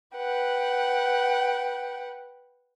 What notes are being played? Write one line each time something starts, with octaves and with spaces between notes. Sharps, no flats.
B4 F#5 G5